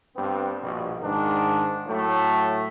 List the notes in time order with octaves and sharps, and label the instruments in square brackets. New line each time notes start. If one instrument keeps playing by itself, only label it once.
[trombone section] G2 B3 C4
A#1 B2
G#2 D#3 D4
A2 F#3 A3